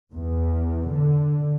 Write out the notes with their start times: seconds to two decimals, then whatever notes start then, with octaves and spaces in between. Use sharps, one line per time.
0.13 E2
0.93 D3